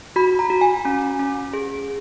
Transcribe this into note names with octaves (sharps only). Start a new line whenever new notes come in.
F#4 B5
A#5
F#4
G#5
C#4
C#4
G#4